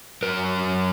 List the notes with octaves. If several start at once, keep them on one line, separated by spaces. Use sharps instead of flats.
F#2 F#3 A#4